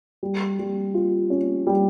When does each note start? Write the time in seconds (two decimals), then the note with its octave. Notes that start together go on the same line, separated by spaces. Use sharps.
0.23 G3
0.59 G3
0.94 F4
1.30 C#4
1.67 G3